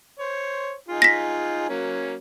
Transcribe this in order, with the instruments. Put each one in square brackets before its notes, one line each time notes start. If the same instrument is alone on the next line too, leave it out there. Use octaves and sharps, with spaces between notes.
[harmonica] C5 C#5
D#4 F4 G#4
[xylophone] A#6 B6
[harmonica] F#3 A#3 C#4